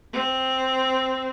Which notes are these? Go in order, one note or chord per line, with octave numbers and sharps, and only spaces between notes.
C4